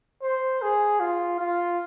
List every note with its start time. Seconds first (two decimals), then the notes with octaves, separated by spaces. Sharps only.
0.23 C5
0.62 G#4
1.00 F4
1.39 F4